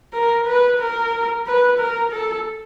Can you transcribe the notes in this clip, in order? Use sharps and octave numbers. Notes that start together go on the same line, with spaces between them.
A#4
B4
A#4
B4
A#4
A4